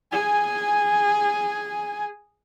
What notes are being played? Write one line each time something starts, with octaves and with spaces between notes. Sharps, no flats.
G#4 G#5